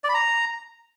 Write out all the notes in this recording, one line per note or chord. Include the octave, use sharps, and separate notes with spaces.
D5
B5
A#5